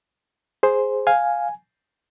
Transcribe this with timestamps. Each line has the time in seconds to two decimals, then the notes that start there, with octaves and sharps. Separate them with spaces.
0.63 G#4 C5
1.07 F5 G#5